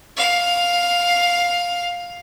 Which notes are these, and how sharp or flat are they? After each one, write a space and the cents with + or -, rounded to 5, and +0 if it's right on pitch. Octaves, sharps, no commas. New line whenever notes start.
F5 +5